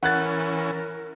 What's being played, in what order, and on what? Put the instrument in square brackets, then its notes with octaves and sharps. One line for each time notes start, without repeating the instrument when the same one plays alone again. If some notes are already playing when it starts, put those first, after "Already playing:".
[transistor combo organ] E3 C#4 [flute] A#4 [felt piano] F#5 F#6 A6